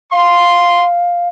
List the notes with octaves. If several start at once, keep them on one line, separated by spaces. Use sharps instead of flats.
F5 C6